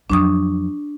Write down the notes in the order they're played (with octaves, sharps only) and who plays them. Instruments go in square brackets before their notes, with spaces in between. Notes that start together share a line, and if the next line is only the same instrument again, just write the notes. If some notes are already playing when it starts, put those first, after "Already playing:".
[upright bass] F2 F#3 [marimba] D4 C#6 D#6